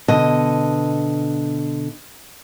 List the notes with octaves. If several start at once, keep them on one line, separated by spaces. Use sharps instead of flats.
B2 D3 D#5